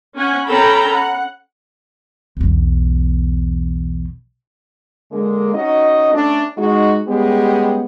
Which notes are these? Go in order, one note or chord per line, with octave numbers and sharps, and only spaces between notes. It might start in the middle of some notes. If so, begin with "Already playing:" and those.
C#4 F#5 G#5
C#4 A4 G5 A#5 B5
F#5
B1 E2
D3 G#3 A#3
C#4 D#4 F#4 D#5
A3 C#4 D4
G#3 D#4 F#4
G3 G#3 B3 C#4 G4 G#4